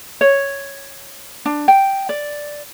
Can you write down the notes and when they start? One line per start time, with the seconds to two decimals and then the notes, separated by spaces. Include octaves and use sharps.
0.21 C#5
1.46 D4
1.68 G5
2.09 D5